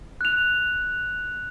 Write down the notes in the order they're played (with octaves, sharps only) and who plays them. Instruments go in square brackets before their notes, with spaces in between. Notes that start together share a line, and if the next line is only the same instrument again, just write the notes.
[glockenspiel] F#6 F7